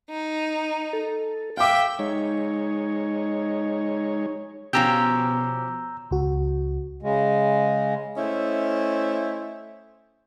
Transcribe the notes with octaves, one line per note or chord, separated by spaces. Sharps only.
D#4
A4
E5 F5 G5 D6
G#3 D#4 C#5
B2 F3 C#4 G4 A#5 E6 G6
C#2 F#4
C#3 G#3
A3 C#4 E4 C5 D#5